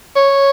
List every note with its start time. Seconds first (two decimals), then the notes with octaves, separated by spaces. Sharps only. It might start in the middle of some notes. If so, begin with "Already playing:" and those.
0.16 C#5